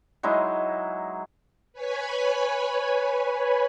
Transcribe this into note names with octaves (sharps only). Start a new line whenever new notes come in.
F#3 G#3 D#4 E4
B4 C#5 G#5 B5